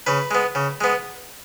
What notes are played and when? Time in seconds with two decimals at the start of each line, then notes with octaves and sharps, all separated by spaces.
0.06 C#3 B4
0.31 G#3 B3
0.55 C#3
0.81 G#3 B3